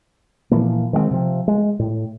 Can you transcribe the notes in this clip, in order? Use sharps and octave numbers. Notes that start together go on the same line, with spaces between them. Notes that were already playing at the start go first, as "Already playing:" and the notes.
A#2 E3 F3 A#3
D#3 G#3 A3 C4
C3 F3
G#3
A2